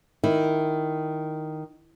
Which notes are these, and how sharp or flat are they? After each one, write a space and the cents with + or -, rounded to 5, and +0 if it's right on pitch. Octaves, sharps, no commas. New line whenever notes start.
D#3 +0 E4 +0